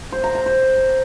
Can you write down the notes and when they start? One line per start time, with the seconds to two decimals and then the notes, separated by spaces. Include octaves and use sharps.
0.12 C5
0.24 A#5
0.35 A#5
0.46 C5